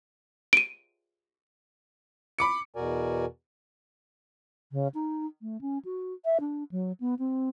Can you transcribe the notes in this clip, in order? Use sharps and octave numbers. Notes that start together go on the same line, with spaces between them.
D7 D#7
B5 D6 C#7
E2 B2 F#4 A#4 D5 G#5
C#3
D#4
A3
C#4
F#4
E5
D4
F#3
B3
C4